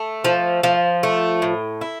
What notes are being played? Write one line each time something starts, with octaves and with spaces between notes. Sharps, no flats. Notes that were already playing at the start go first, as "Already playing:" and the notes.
Already playing: A3
F3
F3
A3
A2
E4